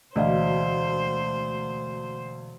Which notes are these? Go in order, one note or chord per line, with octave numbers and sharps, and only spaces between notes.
E1 D2 E3 F#4 C5 D5 D#5 F5